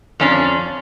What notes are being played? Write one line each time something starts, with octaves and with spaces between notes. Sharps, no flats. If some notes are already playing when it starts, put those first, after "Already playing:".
F2 C#4 D4